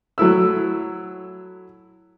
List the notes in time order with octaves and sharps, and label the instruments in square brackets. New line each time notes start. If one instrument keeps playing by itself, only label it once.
[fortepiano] F#3 A3 E4 E6